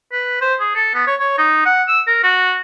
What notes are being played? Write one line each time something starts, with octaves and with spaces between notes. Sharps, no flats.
B4
C5
G#4
A4
B3
C#5
C#5
D#4
F#5
E6
A#4
F#4